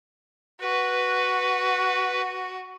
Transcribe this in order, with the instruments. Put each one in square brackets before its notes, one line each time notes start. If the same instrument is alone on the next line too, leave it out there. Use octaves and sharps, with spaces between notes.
[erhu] F#4 [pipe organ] B4